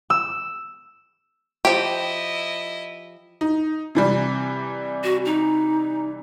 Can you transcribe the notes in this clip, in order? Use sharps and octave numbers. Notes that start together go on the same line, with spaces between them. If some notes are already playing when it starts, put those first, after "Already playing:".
E6
F3 E4 G4 D#5
D#4
C3 E3 G3
F#4
D#4